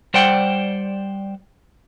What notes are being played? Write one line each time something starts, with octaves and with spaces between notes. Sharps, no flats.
G3 C5 D5 F#5 G5